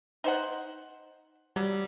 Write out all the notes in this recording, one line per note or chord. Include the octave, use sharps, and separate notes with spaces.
D#4 C5 F#5
F#3 G3